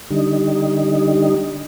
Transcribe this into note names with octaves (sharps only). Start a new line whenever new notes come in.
D3 G3 D#4